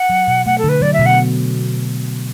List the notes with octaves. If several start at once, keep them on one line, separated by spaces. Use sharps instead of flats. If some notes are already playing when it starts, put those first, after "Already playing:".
Already playing: F#5
F#3
B2
A3 F#5
A4
D3 B4
F#3 D5
E5
B2
F#5